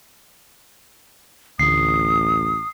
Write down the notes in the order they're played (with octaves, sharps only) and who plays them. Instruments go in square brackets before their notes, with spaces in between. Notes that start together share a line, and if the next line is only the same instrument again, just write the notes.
[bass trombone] A1 [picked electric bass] D2 [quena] D#6 [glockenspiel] C7